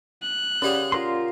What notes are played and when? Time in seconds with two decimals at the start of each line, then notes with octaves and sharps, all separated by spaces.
0.22 F#6
0.62 C#3 C#4 G4 G#4 D5 F#5
0.92 F4 A#4 C6